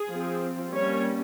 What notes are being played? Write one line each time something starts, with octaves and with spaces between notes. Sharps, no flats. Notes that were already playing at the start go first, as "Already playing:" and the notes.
Already playing: G#4
F3 C4
G3 A#3 C#4 C#5